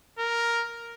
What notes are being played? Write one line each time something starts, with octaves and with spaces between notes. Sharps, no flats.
A#4